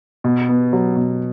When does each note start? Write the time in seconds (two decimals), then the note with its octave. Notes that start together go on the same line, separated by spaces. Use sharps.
0.24 B2
0.49 B3
0.73 F#3
0.96 B2